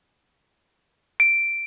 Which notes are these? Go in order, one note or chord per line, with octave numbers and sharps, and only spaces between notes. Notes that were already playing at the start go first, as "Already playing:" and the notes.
D7